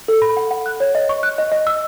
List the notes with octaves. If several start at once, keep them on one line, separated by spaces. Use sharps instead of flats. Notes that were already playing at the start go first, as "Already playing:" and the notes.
A4
B5
F#5
F#5
F#6
C#5
D#5
C#6
F#6
D#5
D#5
E6